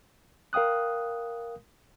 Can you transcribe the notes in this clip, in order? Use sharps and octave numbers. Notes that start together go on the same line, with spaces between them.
A#4 F5 G5 D#6 F#6